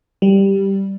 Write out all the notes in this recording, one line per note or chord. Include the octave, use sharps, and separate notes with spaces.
G3